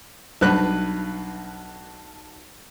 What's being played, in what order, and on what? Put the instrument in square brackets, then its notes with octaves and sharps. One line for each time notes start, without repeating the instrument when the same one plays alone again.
[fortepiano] B1 G2 B4 F#6